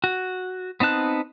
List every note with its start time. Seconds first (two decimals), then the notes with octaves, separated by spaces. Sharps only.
0.04 F#4
0.80 B3 C4 D#4 A5 F#6